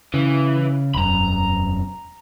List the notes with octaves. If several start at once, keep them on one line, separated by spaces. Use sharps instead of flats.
C#3 E3
E1 F#2 A#5 B5